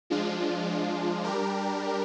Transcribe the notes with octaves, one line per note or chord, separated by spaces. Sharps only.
F3 G#3 D4 F4
G3 D4 G4 A#4